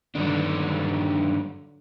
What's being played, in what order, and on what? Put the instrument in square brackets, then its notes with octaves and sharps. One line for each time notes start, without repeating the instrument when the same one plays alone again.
[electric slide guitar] G2 D#3 D4 [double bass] D3 F#3